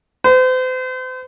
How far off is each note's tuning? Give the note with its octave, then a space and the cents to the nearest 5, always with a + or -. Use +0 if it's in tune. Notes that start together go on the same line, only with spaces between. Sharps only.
C5 -40